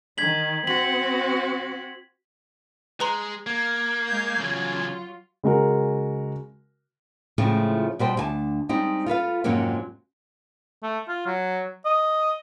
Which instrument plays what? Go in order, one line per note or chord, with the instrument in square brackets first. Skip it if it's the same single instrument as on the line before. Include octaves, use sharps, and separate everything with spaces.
[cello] D#3 [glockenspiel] G#6 B6 F#7
[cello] C4 F#4 [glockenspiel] B6 F#7
[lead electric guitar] G#3 [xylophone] B4 A#5 C6
[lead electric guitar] A#3 [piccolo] G#6
[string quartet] G#3 F5 G6
[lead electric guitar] E2 C#3 [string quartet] F#3 F4
[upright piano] C#3 G#3 F#4 A#4
[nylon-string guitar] A2 C#3 F3 G#3 A3 C4
B2 G3 C5 G5
D2 G#5 A5
G3 G#3 C4 D#4
F4 A4 B4 F5
F2 G#2 C3 F#3 A#3 C#4
[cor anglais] A3
F4
F#3
D#5